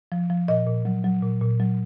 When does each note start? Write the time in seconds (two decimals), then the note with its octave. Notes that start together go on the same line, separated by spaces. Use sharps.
0.12 F3
0.30 F3
0.48 A#2 D#5
0.67 A#2
0.85 F#3
1.04 F#3
1.22 A#2
1.42 A#2
1.60 F#3